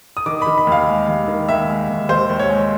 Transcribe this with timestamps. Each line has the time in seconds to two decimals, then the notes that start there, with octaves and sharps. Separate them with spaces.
0.17 D#6
0.26 D#3 D6
0.42 D#3 B5
0.58 B5
0.67 D#2
0.72 F5
0.87 G#3
1.08 D#2
1.28 D#3
1.49 D#2 E5
1.68 G#3
1.89 D#2
2.09 D#2 C5
2.29 D#2
2.39 C#5
2.49 G#3